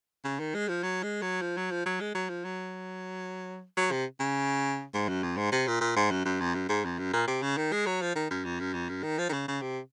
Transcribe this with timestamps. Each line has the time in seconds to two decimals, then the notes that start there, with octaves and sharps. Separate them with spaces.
0.24 C#3
0.40 D#3
0.55 G#3
0.69 F3
0.83 F#3
1.03 G#3
1.22 F#3
1.41 F3
1.57 F#3
1.71 F3
1.86 F#3
2.01 G#3
2.15 F#3
2.29 F3
2.45 F#3
3.77 F#3
3.92 C3
4.20 C#3
4.94 G#2
5.08 F#2
5.23 F2
5.37 G#2
5.52 C3
5.67 A#2
5.81 A#2
5.96 G#2
6.11 F#2
6.25 F#2
6.41 F2
6.55 F#2
6.69 G#2
6.85 F2
6.99 F#2
7.13 A#2
7.28 C3
7.42 C#3
7.57 D#3
7.72 G#3
7.86 F#3
8.02 F3
8.15 D#3
8.31 F#2
8.45 F2
8.60 F#2
8.74 F2
8.89 F#2
9.03 D#3
9.18 F3
9.29 D#3
9.33 C#3
9.48 C#3
9.62 C3